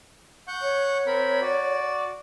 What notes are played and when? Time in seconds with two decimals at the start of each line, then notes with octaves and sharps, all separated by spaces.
0.48 F#5 C#6 G6
0.62 C#5
1.07 C4 A#4 B5
1.41 F#4 D5